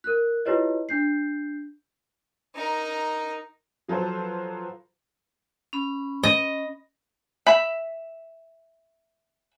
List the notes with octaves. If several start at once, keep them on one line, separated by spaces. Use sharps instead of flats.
A#4 F#6
E4 F4 G4 B4 C#5 D#5
D4 G6 C7
D#4 A#4
F3 F#3 F4 A4 B4 C5
C#4 B5
D#5
E5 B5